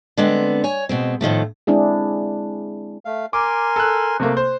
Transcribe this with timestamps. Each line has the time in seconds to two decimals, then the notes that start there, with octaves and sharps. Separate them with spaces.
0.18 D3 G#3 B3 C4
0.64 C#5 G#5
0.89 B2 G#3 C4
1.21 A2 D#3 F3 A3
1.67 G#3 C4 D4 E4 G#4
3.05 A3 F5
3.33 A#4 G#5 C6 D6
3.76 A4 F#6
4.20 C3 A3 A#3
4.37 C5